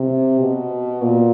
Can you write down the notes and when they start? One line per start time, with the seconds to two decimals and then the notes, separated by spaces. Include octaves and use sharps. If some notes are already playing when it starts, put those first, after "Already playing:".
Already playing: C3
0.39 B2
1.02 A#2